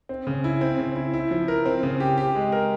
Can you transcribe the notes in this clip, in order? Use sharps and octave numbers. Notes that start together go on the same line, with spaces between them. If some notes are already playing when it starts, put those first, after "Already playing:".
C4
C#3
E4
C4
C#3
E4
E4
F3
A#4
C4
C#3
G4
G4
G#3
A#4